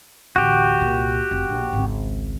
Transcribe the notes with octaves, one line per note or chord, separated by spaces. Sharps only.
A1 D2 F#4 G4
C2 A#2
F1
A#1 B2
G#1 C#2